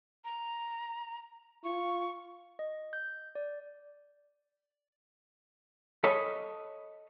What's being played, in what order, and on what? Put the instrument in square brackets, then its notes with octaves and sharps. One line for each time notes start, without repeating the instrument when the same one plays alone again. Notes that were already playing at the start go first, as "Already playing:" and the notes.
[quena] A#5
[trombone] F4 [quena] C#6
[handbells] D#5
G6
D5
[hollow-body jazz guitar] A4 C#5 D#5 B5